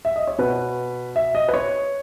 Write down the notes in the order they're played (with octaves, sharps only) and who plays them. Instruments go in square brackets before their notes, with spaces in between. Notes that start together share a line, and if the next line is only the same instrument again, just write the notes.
[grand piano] E5
D#5
C#5
B2 B4
E5
D#5
B4
C#5